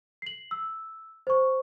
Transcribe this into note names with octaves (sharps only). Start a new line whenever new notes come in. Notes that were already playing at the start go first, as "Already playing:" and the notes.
C7 F#7
E6
C5 C#6